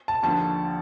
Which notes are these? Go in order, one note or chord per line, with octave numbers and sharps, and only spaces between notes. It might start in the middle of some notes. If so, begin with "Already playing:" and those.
A5
D#2 D3 F3 A5